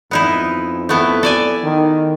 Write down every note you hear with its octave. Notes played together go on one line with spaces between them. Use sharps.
F2 B3 D#4 E4
A3 B3 E4
A4 D5 G#5
D#3